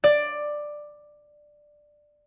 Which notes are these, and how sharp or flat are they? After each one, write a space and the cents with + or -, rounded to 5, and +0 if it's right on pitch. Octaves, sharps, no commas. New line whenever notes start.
D5 +10